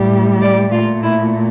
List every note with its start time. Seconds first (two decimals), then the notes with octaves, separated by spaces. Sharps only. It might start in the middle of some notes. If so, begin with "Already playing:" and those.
Already playing: A2 G3
0.41 D5
0.71 A#2 A3 F4
1.02 E4